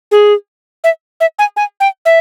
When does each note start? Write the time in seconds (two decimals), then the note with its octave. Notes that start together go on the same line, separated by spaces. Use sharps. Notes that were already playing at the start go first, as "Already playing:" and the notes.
0.11 G#4
0.84 E5
1.21 E5
1.39 G#5
1.57 G#5
1.80 G5
2.06 E5